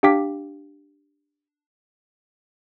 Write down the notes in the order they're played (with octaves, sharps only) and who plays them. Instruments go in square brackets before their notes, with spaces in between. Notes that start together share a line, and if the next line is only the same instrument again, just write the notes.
[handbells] D4 G4 F5 G5 D6 B6